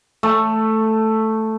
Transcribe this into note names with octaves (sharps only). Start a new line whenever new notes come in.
A3